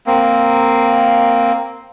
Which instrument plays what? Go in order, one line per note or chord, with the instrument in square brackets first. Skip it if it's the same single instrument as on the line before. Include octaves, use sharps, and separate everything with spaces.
[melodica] A#3 C4